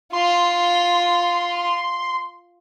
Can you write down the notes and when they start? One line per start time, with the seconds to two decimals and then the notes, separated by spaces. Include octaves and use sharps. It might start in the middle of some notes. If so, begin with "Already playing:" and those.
0.13 F4 C6